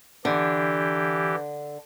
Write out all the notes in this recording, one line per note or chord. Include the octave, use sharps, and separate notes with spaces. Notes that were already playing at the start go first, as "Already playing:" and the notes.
D3 E3 G4